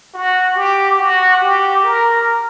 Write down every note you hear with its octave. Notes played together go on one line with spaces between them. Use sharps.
F#4
G4
F#4
G4
A#4